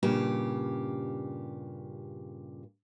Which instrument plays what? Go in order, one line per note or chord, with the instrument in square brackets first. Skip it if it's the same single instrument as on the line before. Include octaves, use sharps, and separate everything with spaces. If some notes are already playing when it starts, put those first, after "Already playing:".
[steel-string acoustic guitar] G2 A#2 C#3 G4